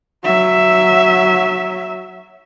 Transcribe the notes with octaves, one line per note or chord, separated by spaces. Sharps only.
F#3 E5